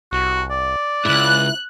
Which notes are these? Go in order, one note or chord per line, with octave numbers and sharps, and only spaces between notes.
C2 F#4
D5
C#2 G#2 E4 F#6